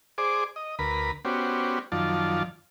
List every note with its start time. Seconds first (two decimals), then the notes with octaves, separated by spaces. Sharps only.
0.18 G#4 C5 D5 D6
0.56 D#5
0.79 D2 A#4 B4 B5
1.25 B3 C#4 F#4 G4 C5 D5
1.92 F#2 D#3 F3 F4 D5 A5